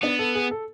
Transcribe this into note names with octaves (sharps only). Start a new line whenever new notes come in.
B3 D4
A4
G#4
A4